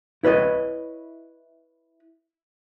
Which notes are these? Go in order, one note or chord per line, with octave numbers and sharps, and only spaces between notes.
E4 B4 C#5 D#5